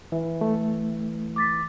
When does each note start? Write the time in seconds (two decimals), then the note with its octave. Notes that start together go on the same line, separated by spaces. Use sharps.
0.12 E3 E5
0.41 A3
1.36 D6 A6 B6